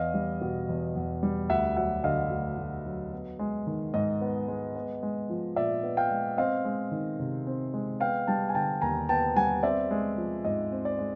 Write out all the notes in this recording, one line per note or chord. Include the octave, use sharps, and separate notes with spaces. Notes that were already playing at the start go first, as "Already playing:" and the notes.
Already playing: E2 D#5 F5
G3
B2
E2
E2
G3
D2 E5 F#5
F#3 E5 F#5
D3 D#5 F5
D2
D2
F#3
B3
G#3
D#3
G#2 D#5
B3
G#3
B3
G#3
F3
A#2 D5 E5
B3
F5 G5
G#3
C4 D#5 F5
G#3
D#3
C3
C4
G#3
B3 F5 G5
G3 G5 A5
G#5
D3 G5 A5
D#2 G#5 A#5
B3 G5 A5
G3 F#5 G#5
C4 D5 E5
G#3
F3
G#2 D#5
C4
D5
G#3